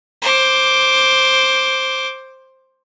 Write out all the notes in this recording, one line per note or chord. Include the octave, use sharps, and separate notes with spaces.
C5 D6